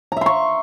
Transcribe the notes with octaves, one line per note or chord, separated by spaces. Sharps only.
E5 A#5 C6 C#6